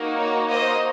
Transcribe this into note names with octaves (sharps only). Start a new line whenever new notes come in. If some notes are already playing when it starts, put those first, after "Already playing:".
Already playing: A#3 D#4 F#4
C#5
C5 D#5